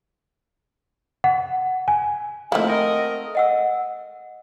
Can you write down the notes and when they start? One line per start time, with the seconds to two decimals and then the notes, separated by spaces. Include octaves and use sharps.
1.24 F#5
1.88 G#5
2.52 D#3 F3 A3 A#3 C4 E4 F#5
2.69 A#4 D#5
3.35 D#5 F#5 E6